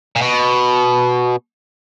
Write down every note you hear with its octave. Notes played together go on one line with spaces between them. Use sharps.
A#2
B2